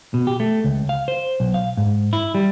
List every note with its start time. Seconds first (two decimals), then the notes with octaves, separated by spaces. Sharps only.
0.14 B2
0.27 G4
0.40 A3
0.64 C#2
0.89 F5
1.08 C5
1.40 B1
1.54 F5
1.77 G#2
2.13 E4
2.35 G3